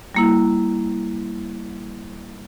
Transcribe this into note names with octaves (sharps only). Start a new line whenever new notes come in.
G3 A#3 E4